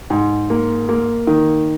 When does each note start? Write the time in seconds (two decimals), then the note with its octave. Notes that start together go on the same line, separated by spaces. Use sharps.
0.10 G#2
0.50 A#3
0.89 A#3
1.27 D#3